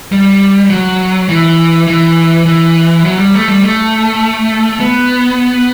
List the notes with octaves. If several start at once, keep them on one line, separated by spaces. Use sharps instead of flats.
G3
F#3
E3
E3
E3
F#3
G3
A3
G3
A3
B3